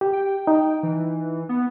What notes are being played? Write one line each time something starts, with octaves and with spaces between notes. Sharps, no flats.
G4
G5
D#4
E3
B3